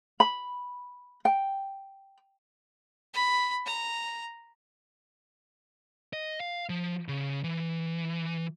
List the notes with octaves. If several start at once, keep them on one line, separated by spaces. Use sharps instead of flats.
B5
G5
B5
A#5
D#5
F5
F3
C#3
E3